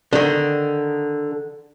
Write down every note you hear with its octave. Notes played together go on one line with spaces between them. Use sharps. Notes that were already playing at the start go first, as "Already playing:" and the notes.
D3 D#3